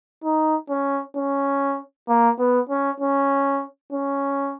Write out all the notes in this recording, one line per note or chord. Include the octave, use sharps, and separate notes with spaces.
D#4
C#4
C#4
A#3
B3
C#4
C#4
C#4